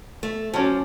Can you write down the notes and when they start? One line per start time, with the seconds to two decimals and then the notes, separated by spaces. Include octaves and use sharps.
0.23 A3
0.54 F3 F#3 C#4 F#4 D5 A5